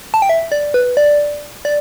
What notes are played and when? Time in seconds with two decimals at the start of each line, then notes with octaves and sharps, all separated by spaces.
0.14 A5
0.22 G5
0.30 E5
0.52 D5
0.74 B4
0.97 D5
1.65 D5